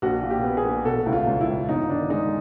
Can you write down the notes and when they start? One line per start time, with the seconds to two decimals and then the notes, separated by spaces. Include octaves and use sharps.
0.02 A#1 F#4
0.22 A#2
0.30 G4
0.44 B3
0.57 G#4
0.65 A#1
0.85 B2 A4
1.06 C#2 E4
1.13 F4
1.27 C#2
1.41 E4
1.48 C#2
1.69 G1 D#4
1.90 D#3 D4
2.10 G#3 D#4